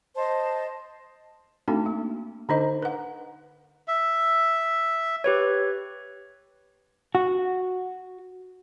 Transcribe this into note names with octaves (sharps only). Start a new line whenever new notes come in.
C5 D#5 A5
A3 C4 D4 D#4 F#4 A4
A#3
D3 D4 D#4 C5 D#5
B4 F#5
E5
G4 B4 C#5
F#4